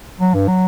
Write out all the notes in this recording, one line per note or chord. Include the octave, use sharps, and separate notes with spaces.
F#3
G2
F#3